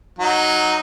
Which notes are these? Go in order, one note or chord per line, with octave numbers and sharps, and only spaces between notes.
F#3 D#4